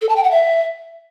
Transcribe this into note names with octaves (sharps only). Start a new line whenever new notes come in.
A4
A5
G5
F#5
E5